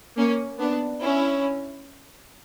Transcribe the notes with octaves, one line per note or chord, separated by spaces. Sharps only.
A#3 C#4
B3 D4
C#4 E4